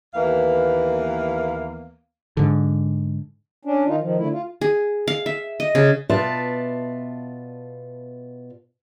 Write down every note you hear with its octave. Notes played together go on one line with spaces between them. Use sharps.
D#2 E3 A#3 B3 F5
G#2 D3
C#4 D4
D#3 D#4 F4
D#3 F3
D3 A3 E4
F4
G#4
F5
E5
D#5
C#3
B2 F4 B4 D5 E5 A5